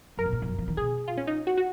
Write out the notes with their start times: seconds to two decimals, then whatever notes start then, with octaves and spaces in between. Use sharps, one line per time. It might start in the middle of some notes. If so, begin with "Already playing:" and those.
0.17 F#2 A#4
0.26 A#2
0.32 G#2
0.42 F2
0.48 F#2
0.58 F3
0.68 D#3
0.77 B2 G#4
1.08 F4
1.17 C#4
1.27 D#4
1.47 F#4
1.58 F#4